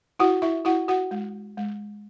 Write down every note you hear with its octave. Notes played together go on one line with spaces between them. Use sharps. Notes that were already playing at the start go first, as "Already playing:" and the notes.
E4 F#4 F#5
E4 E5
E4 F#4 F#5
F#4 F#5
G#3
G#3